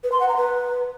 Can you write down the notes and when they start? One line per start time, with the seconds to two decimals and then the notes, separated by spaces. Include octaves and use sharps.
0.04 B4
0.12 C6
0.20 F#5
0.28 A#5
0.37 B4